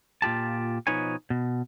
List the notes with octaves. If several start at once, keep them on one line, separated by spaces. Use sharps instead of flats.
A#2 F4 G4 A5
B2 F3 D#4 B4 C#5 G#5
B2